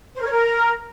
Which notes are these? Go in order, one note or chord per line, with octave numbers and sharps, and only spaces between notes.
C5
A#4
C#5
A#4